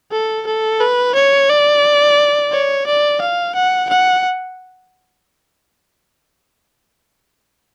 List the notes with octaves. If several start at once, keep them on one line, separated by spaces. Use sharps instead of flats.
A4
A4
B4
C#5
D5
C#5
D5
F5
F#5
F#5